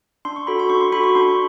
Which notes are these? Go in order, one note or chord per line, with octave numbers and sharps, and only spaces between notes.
D4 C6
C#6
F#4 A4 B5
C6
D4 C#6
C6
F#4 A4 B5
C#6
D4 C6